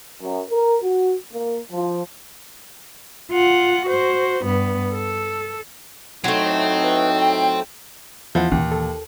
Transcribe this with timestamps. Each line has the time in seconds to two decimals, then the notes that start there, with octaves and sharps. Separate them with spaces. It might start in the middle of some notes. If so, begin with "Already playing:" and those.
0.22 F#2
0.50 A#4
0.83 F#4
1.33 A#3
1.72 F3
3.31 F4 F#5
3.86 F#4 C5
4.45 G2 B3
4.93 A4
6.24 A2 F#3 A3 C4 D#4
6.83 B4
7.18 G5
8.35 E2 F3 E4 F#5
8.52 D#2 A#2 E3
8.72 A4